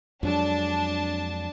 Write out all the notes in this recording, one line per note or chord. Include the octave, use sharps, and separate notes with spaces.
F2 F#3 G#3 D4 A5